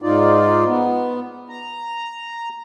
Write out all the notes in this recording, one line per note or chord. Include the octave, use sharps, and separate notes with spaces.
G#2 D#4 F4 D5
B3
A#5